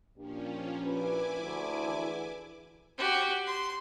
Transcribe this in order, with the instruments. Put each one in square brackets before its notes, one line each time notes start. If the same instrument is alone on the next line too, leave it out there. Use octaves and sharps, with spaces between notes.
[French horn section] A#2 D4 G4 [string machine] F3 C#4
[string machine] E4 G#5 D6 [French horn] B4
[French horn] D2
[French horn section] E3 G#4 B4
[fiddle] F#4 G4
C6